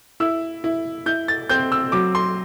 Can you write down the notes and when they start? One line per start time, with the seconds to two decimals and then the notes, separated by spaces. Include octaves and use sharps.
0.20 E4 E6
0.64 E4
1.06 E4 G6
1.28 A6
1.49 C4 G6
1.72 E6
1.92 F#3 D6
2.15 C6